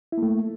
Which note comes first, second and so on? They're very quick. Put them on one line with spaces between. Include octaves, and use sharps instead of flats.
E4 A#3 A3